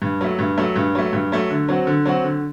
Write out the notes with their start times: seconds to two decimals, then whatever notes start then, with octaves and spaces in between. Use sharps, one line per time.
0.02 G2
0.21 F#3 A3
0.39 G2
0.58 F#3 A3
0.76 G2
0.95 F#3 A3
1.13 G2
1.32 F#3 A3
1.50 D3
1.68 F#3 C4 F#4
1.87 D3
2.05 F#3 C4 F#4
2.24 D3